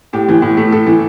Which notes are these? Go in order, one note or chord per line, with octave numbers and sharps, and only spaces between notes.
A2 G4
E3
A2
A3
A2 A4
E3